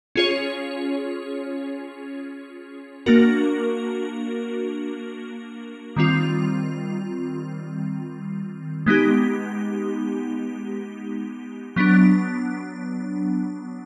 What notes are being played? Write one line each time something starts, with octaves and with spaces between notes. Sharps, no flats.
C#4 F4 G#4 C#5
A#3 D4 F#4 A#4
D#3 G3 C4 F4
G#3 B3 D#4 G4
F#3 B3 D4